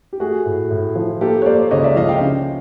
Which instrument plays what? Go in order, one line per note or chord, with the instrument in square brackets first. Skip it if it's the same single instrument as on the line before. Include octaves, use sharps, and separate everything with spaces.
[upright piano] G4
A3 F#4 G#4
A2
A2
F3
A#3 G4 A4
C#5
A#3 C5 D5
C#2 C#5 D#5
D5 E5
F3 D#5 F5
F5 G5
C#3